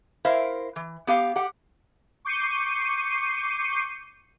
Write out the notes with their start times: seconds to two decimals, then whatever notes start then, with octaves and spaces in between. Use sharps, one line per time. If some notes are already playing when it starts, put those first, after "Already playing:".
0.25 E4 A#4 C5 E5 F5
0.76 E3
1.07 B3 G4 F5
1.36 G4 F#5
2.25 C#6 D6 G6 C7 C#7 D#7